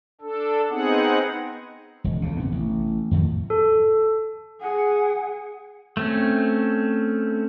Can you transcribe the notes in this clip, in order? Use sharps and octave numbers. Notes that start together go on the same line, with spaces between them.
D4 A4
B3 C4 D#4 G#4 F#5
E1 C#2
D2 C#3
C3 B3
A1
F2 A2 D#3 F#3
A4
G#4 F#5
A3 C4 C#4